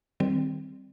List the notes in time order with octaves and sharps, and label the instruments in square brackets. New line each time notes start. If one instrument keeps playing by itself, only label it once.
[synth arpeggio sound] D#3 G3 C4